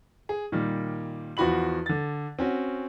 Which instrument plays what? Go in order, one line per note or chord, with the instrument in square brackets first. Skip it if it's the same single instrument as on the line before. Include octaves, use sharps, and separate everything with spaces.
[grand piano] G#4
A#2 D#3 G3
E2 F3 F#4 B5 F#7
D3 A6
C4 C#4 F#4